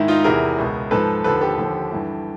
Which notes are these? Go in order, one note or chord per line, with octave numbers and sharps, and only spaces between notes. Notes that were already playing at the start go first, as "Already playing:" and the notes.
Already playing: G#2 D#3 E4
D#4 F4
E2 C3 E3 G#4 A#4
C#2 B2
G#2 F3 A4 B4
D#2 D3 F3 A4 B4
G4 A4
D#2 D3 F3
G2 E3